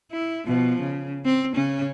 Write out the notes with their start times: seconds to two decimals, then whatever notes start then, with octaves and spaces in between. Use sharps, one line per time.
0.12 E4
0.47 B2 F3
0.81 C#3
1.25 C4
1.56 C#3 C#4